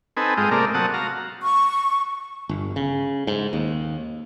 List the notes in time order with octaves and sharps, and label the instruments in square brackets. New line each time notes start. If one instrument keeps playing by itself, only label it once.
[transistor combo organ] C4 D#4 A4 B4 G#5
G#2 G#3 F4 D#5 G5
C3 A3 A#3 A#4 D5
C3 F#3 F#5 A5 D#6
F#4 F5 A#5
[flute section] C#6
[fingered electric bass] G1
C#3
G#2
D#2